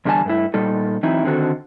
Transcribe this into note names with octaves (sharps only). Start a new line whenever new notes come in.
E2 D3 G3 D#4 G#5 A5
G2 A3 E4
A#2 G3 D#4 A4
E3 F#3 C4 D#4 E4
D3 D#3 C4 F#4 A4